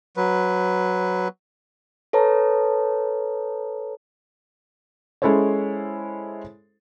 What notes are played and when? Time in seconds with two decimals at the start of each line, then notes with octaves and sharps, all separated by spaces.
0.17 F#3 B4
2.13 A4 B4 C#5 A5 A#5
5.22 G#3 C#4 E4 A4 C5 C#5